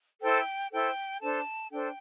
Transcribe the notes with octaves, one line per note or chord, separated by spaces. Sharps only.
E4 A4 C5 G5
E4 A4 C5 G5
D4 A4 C5 A5
D4 A4 C5 G5